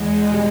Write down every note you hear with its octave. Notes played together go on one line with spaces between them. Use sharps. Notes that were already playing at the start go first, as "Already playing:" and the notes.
Already playing: E2 G#3
B2 G3